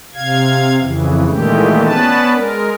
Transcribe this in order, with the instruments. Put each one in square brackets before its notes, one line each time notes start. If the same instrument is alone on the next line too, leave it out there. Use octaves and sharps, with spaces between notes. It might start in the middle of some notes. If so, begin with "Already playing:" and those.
[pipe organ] C3 F5 G#6
F2 C#3 E3
A#2 D#3 E3 G#3 A3 G4
B3 C#4 D4 B4 A5
G#3 A#4